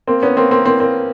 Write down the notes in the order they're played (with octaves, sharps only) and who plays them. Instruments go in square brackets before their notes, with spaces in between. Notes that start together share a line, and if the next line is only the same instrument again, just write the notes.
[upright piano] A#3 C4
B3 C#4
A#3 C4
A#3 C4
A#3 C4
A#3 C4